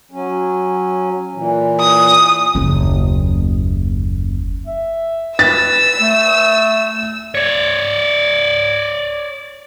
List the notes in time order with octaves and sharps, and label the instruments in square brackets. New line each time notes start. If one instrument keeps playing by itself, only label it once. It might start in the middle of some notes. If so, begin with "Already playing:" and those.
[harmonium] F#3 C#4
A#2 E3
[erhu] D#6
[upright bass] F#1 D#2
[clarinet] E5
[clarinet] B4 [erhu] E6 [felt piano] A6
[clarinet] A3
[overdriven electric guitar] C#5 D5